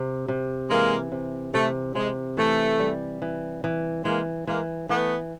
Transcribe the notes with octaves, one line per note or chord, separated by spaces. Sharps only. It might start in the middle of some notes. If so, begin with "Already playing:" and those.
Already playing: C3
C3
E3 G#3 A#3
C3
C3 A3
C3 G#3
E3 A3
G3
E3
E3
E3 G#3 A#3
E3 G#3 A#3
E3 A3 B3